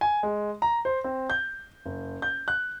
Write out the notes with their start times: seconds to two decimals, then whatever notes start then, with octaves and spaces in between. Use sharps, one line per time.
0.01 G#5
0.23 G#3
0.62 A#5
0.85 C5
1.04 C4
1.30 G6
1.85 F#1
2.22 G6
2.48 F#6